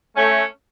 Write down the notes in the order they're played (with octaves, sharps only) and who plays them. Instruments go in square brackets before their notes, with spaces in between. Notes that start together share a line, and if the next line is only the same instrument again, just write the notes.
[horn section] A3 C#4